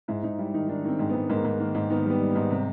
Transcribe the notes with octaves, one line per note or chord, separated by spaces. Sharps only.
G#2 E4
G#2 D#4
G3 E4
D#3 D#4
D#3 D4
D#3 C4
G#2 C4
G#2 B3
G#2 A#3
G#2
D#3 A#3
G#2
D#3 B3
G3 B3
G3
G#2 B3
C3